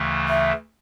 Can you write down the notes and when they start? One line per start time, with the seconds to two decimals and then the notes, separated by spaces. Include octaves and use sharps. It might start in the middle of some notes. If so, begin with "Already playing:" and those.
Already playing: D2 C#3 E3 A3
0.28 E5